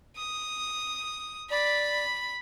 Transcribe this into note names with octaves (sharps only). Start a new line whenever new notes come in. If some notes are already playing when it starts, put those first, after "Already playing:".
D#6
D5 B5